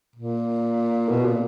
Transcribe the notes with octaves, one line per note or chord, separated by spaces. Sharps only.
A#2
B2
A#2